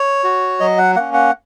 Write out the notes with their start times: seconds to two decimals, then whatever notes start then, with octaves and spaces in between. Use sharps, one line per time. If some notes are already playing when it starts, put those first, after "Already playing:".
Already playing: C#5
0.24 F#4
0.60 F#3 D#5
0.78 F#5
0.96 A#3 C#4 F#5
1.14 F#5